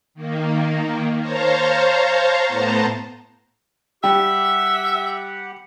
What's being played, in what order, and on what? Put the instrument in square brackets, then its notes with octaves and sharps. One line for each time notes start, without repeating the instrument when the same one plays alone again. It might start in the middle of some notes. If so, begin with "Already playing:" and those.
[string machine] D#3 A#3
C5 C#5 F5 A5 A#5
A2 B3 C5 A5 A#5
[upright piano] G3 [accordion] G4 F#5 [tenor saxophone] E5 [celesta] G5